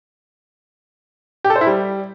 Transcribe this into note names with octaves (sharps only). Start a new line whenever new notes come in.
G4
A4
C5
E4
G3